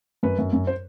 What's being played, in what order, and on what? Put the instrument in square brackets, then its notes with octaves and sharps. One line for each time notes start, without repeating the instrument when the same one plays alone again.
[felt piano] F#2 B4
F#2
F#2
C5